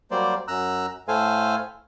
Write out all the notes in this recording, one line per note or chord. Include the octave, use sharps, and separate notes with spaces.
F#3 G3 A#3 C5 D5
F#2 A#5 E6 F#6
A2 A3 A4 C5 F5 G#5